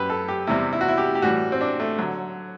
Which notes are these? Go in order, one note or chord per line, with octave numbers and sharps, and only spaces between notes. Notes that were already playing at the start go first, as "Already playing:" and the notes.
Already playing: F#2 F#3 G4 B4
A4
G4
E2 C3 G3 E4
E4
F#4
E4
G4
G4
A2 E3 G3 F#4
C4
D4
A3
D3 F#3